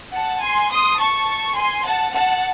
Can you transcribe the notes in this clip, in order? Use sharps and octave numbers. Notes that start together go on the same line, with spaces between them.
F#5 A5
G#5 C6
C6 D#6
A5 C#6
G#5 C6
F#5 A5
F#5 A5